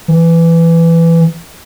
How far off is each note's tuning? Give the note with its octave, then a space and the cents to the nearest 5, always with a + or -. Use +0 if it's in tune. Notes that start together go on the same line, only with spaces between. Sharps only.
E3 +15